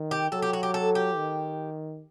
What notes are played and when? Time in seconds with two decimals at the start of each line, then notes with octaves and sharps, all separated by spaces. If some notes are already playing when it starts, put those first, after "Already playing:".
Already playing: D#3
0.11 G4
0.32 F#3 A4
0.42 G4
0.53 F#4
0.63 G4
0.74 A4
0.95 G4
1.17 D#3